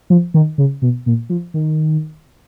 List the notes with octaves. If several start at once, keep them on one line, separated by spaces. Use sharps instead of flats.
F3
D#3
C#3
B2
A#2
F3
D#3